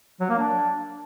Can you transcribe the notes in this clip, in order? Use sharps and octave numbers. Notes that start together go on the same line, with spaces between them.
F#3
A#3
D4